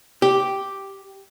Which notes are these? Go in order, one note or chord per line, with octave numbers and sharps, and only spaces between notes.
G4